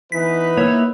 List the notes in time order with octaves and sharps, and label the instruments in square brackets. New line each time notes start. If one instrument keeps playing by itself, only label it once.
[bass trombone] E3 [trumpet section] B3 D#4 B4 [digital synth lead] B6
[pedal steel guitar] A#3 E4 E6 [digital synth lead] C#5